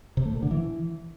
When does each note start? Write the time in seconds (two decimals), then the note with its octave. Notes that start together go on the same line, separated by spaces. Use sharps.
0.17 C3
0.26 A3
0.34 A#2
0.42 D3
0.51 E3